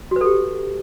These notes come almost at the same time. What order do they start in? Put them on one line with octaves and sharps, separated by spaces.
F#4 B4 A4 G4